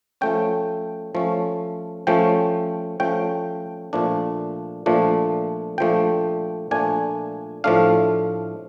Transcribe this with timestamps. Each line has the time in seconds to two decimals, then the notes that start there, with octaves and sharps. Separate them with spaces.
0.21 F3 A3 C#4 G5
1.15 F3 A3 C#4
2.07 F3 A3 C#4 G5
3.00 F3 A3 C#4 G5
3.93 A#2 F3 A3 D4
4.86 A#2 F3 A3 D4
5.78 A#2 F3 A3 D4 G5
6.71 A#2 F3 A3 D4 G#5
7.64 A2 F3 A3 D4 F5